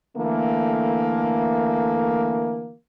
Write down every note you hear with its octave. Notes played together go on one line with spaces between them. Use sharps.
D3 E3 A3 A#3